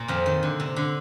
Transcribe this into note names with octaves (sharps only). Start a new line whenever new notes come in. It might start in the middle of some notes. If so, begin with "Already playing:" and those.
Already playing: A#2 A#3
F2 F3
D#3
D3
C3
D3